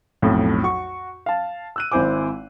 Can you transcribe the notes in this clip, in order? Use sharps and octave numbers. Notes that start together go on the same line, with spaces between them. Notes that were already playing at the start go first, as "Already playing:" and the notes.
B1 F2 A2
F#4 C#6
F5 A5
E6 F#6 D#7
G#1 C4 E4 C5 G#5 D6